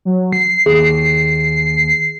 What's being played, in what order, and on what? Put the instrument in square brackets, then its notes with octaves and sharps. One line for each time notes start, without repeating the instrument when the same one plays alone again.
[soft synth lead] F#3
C7
[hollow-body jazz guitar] D#2 [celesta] G#4